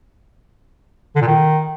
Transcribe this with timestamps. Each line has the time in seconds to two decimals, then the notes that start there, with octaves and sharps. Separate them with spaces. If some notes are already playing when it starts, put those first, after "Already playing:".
1.16 D3
1.22 A#2
1.27 D#3